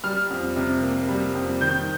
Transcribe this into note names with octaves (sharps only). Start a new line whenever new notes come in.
G3 F6
F2
C3
A#3
G3
F2
D#3 G6